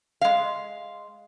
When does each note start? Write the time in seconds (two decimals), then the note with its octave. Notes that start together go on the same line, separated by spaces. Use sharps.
0.21 G#3 F5